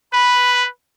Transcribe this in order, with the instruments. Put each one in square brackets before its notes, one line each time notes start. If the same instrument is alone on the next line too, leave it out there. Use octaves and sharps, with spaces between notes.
[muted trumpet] B4 [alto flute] B5